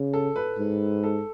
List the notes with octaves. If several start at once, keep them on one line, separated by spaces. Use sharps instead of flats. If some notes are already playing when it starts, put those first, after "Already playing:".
Already playing: C#3
A4
B4
G#2
A4